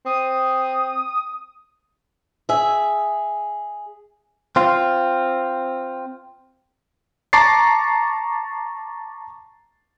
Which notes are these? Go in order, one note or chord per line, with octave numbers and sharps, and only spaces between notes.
C4 D#6
G#4 E5
C4 F4
A5 A#5 C#6 D6 A6 C7